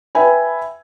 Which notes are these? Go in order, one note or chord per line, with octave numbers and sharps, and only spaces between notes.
B4 E5 G5 G#5 B5